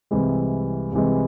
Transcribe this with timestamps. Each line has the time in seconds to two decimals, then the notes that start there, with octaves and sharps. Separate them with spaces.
0.11 C2 C3 E3 G#3
0.93 C2 C3 E3 G#3